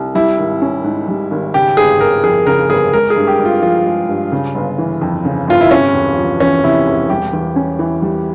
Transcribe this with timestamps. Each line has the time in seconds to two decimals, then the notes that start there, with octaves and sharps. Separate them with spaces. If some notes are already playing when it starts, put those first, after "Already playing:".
Already playing: C2
0.15 G3 E4
0.38 G#1
0.62 C#4
0.84 G#2
1.08 G3
1.31 G#1
1.54 C#3 G4
1.77 G1 G#4
2.00 G1 A#4
2.23 F2 G#4
2.47 C#3 A#4
2.70 G1 G#4
2.93 G#3 A#4
3.10 G#4
3.16 G2
3.27 G4
3.39 G2
3.45 F4
3.62 F3 F4
3.86 G#3
4.09 G2
4.32 C#3
4.55 G1
4.78 E3
5.01 F2
5.25 C#3
5.48 G1 F4
5.61 E4
5.71 C3 C#4
5.94 E1
6.17 F3
6.40 E2 C#4
6.63 C3 E4
6.87 E1
7.10 G3 G4
7.33 E2
7.56 C#4
7.79 E3
8.02 G3